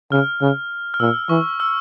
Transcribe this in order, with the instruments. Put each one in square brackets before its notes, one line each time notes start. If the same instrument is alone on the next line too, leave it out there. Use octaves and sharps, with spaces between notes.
[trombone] C#3 [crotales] F6
[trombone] C#3
[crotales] F6
[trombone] A#2 [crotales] E6
[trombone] E3 [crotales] C#6
[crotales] E6